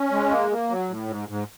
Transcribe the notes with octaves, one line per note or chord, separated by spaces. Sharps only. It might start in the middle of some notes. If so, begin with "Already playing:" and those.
Already playing: C#4
G#3
A#3
A#3
F#3
A2
G#2
G#2